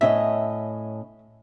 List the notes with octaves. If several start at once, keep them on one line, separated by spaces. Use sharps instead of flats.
A2 C#4 D#5 E5